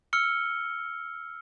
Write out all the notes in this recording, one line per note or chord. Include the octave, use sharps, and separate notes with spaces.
E6 F6 C#7 G7